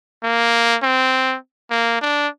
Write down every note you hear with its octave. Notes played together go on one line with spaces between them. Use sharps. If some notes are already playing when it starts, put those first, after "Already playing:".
A#3
C4
A#3
D4